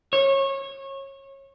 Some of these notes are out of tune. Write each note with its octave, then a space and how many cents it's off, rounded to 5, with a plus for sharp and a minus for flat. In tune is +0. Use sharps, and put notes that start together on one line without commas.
C#5 -25